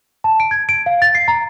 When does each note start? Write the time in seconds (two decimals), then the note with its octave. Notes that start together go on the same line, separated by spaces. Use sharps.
0.24 A5
0.40 D7
0.51 G#6
0.69 D7
0.86 F5
1.02 A6
1.15 C7
1.28 A#5